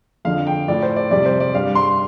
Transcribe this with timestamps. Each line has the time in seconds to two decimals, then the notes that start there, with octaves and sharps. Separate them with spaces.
0.25 F2 D3 F3 F5
0.47 G5
0.68 A2 F3 D5
0.83 C5
0.96 D5
1.11 F2 C3 G3 D5
1.25 C5
1.40 D5
1.54 G2 G3 F5
1.75 C6